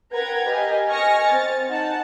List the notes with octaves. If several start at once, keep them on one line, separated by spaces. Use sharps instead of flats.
A#4 B4 F#5 G5 A#5 G#6
G4 D#5 F5 G#5
D#5 G#5 C#6 F6 A#6 C#7
C4 A6
D#4 F#5 A5